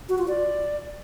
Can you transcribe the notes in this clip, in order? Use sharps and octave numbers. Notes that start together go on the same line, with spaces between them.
F#4
F4
D5